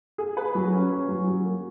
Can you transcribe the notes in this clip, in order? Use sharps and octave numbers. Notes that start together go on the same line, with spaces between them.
G#4
B4
F#3
C#4
C#4
F#3
F#3
A#3